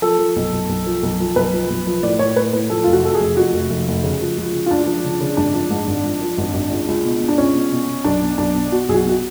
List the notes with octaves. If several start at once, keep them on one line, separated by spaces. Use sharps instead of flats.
F3 A4
F3
B1
B1
B1
F3
B1
F3
B1 B4
F3
B1
F3
A2 D5
A2 C#5
A2 B4
A2 B4
F3 A4
F1 F4
F#4
F2 A4
G#4
F1
F2 F#4
F1
F1
F1
C#3
F3
C#2
C#3
F4
C#2 D4
F3
C#3
C#3
G#1 D4
F3
G#2
G#1
F3
F3
G#1
G#1
C#2
C#2
B2
B2
D4
C#2 C#4
B2
B2
B2
B1 D4
B2
B1 D4
B2
B2 F#4
B1 G#4
F#4
B2 F#4